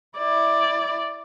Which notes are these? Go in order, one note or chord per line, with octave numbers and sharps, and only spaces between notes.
E4 D5